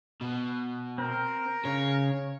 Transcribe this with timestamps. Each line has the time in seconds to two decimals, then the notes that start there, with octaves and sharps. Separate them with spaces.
0.21 B2
0.98 C4 A#4
1.65 C#3 C#5